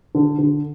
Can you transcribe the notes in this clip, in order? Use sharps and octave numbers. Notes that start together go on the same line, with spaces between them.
D3
D3